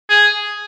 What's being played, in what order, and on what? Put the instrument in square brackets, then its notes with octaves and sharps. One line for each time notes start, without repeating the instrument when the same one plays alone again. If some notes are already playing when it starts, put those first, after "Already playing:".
[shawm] G#4